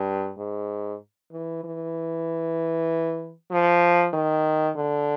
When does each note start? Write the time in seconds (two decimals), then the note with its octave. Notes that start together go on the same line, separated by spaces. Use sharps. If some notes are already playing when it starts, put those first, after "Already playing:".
Already playing: G2
0.38 G#2
1.32 E3
1.64 E3
3.51 F3
4.13 D#3
4.76 D3